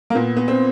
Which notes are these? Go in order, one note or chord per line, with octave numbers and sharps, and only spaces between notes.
A#3
A#2 B3
B3
C4